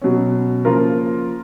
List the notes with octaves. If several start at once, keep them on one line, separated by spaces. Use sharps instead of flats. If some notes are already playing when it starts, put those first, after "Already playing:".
B2 F#3 C#4
C#3 F3 A#3 F4 A#4